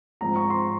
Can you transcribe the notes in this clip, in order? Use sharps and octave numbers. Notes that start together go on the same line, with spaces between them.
G#2 F3 C4 A#5
C#6
C6